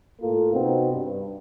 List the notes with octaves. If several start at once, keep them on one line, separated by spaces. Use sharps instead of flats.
A2 A#3 F4 A4
C3 B3 C4 D#4 F#4
G2